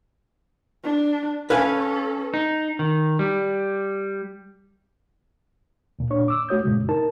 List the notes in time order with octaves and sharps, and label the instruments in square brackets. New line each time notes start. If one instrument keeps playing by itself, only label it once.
[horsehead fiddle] D4
[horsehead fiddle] C#4 A4 [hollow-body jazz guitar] B4 F5 G#5
[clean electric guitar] D#4
D#3
G3
[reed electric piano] D2 A#2
A#2 D4 C#5 C#6
D6 E6
A3 F#4 C#5 D#6 G6
F#2 A#2 C#3 G#3
D#4 A#4 A5